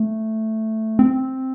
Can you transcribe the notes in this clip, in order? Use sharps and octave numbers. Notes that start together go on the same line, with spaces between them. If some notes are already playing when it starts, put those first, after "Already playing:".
Already playing: A3
C4